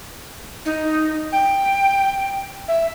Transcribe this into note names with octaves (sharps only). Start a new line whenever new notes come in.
D#4
G5
E5